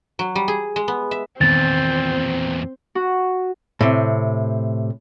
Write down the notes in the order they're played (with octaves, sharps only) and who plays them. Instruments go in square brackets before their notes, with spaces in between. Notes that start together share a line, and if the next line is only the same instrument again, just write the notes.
[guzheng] F#3
G3
G#4
G#3
B3
E5
[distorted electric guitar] E2 A#2 [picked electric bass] D#3 B3 [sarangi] C4 [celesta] A6
[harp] F#4
[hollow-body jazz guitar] A2 C3